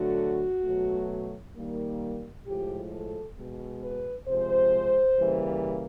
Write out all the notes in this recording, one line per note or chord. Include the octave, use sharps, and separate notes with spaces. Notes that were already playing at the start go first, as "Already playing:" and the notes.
Already playing: D3 F#3 A3 F#4
B2 F#3 A3
D#3 G3 A#3
A2 F3 G#3 G4
A4
B2 G#3
B4
C3 F3 G#3 C5
C#3 E3 G3 A#3